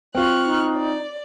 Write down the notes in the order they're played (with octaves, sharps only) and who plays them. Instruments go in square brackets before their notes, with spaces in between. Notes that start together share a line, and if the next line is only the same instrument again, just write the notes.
[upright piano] C4 F4 [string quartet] C#6 F6 F#6
[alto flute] D#4
[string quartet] D5